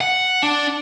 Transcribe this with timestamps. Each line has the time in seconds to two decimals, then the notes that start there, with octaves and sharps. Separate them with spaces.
0.01 F#5
0.43 D4